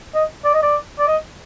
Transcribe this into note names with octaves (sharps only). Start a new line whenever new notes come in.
D#5
D5
D#5
D5
D5
D#5